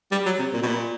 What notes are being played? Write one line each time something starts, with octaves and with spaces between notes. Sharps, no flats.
G3
F#3
C3
A#2
B2
A#2